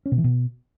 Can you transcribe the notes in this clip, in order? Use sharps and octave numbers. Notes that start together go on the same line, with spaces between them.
C#4
B2
E3
B2